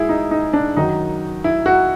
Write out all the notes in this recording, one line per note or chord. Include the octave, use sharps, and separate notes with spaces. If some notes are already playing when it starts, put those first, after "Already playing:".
Already playing: G#2 F#3 E4 G#4
D#4
D#4
D4
F#2 D#3 F#3 D#4
E4
F#4